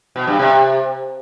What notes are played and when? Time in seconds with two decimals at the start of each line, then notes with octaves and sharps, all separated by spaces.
0.16 B2
0.27 G2
0.39 C3